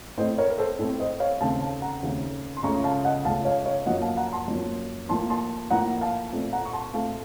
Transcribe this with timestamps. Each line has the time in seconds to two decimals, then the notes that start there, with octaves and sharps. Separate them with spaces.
0.18 A2 A3 C4 C5 D#5
0.38 A#4 C#5
0.50 A#4
0.58 A4 C5
0.79 A2 A3 C4 A4
1.00 C5 D#5
1.20 C#5 F5
1.41 D#2 C#3 A3 C4 F5 A5
1.61 F5 A5
1.82 F#5 A#5
2.02 D#2 C#3 A3 C4
2.57 C6
2.63 C#2 C#3 A3 A#5 C#6
2.84 F5 A5
3.04 D#5 F#5
3.25 C#2 C#3 A3 F5 A5
3.45 C#5 F5
3.66 C#5 F5
3.86 F#2 F3 A#3 D#5 F#5
4.02 F5 A5
4.17 F#5 A#5
4.33 A5 C6
4.48 F#2 F3 A#3
5.09 A2 F3 A#3 A5 C6
5.30 A5 C6
5.70 A2 F3 A#3 F#5 A#5
6.01 F5 A5
6.33 A#2 A3 C4
6.53 F#5 A#5
6.65 C#6
6.73 A5 C6
6.93 A#2 A3 C4 F5 A5